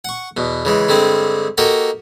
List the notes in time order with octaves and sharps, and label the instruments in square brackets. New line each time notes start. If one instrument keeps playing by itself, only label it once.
[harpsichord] F#5 C#6
E2 B2
C#3 E3 G#3
G2 D3 G3 G#3 C4
A#3 F#4 G4 A4 D#5 F#5